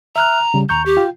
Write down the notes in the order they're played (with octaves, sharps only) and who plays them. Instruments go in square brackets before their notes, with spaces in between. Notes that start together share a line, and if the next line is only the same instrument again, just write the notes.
[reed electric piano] E5 F6 F#6 [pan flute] A#5
[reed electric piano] C#3 G3
[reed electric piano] D#2 C#6 G6 [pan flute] A#5
[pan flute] G4
[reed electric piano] F4 G5